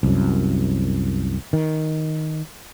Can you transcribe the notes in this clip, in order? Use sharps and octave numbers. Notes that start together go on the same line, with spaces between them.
C2 F#2
D#3